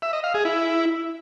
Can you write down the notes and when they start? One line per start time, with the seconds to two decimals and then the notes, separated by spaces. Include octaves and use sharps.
0.02 E5
0.13 D#5
0.24 F5
0.34 G#4
0.45 E4